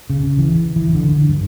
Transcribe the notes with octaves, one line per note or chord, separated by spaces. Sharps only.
C#3
E3
E3
D3
G2